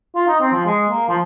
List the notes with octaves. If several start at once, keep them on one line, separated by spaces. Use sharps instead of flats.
F4
D#4
C4
F3
G#3
A#3
F3